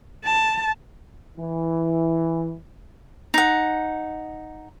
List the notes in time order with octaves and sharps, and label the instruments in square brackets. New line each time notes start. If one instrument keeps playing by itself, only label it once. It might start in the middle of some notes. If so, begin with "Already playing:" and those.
[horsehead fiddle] A5
[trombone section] E3
[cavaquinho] D#4 F#5